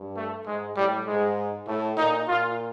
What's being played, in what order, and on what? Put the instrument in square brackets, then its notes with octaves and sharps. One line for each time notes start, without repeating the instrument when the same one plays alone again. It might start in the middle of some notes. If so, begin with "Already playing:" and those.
Already playing: [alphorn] G2
[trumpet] A3
[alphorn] G#2 [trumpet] G#3
[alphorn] A2 [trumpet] G3
[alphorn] G#2 [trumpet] G#3
[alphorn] A2 [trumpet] A3
[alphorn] A#2 [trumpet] D#4
[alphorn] A#2 [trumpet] F4